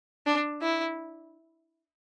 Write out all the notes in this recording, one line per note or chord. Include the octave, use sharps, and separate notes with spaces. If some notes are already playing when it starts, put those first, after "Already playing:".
D4
E4